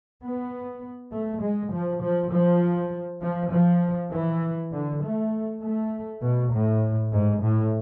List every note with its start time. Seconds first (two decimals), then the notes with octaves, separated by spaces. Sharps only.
0.22 B3
1.12 A3
1.41 G#3
1.72 F3
2.02 F3
2.32 F3
3.21 F3
3.51 F3
4.12 E3
4.72 D3
5.03 A3
5.62 A3
6.22 B2
6.52 A2
7.13 G#2
7.42 A2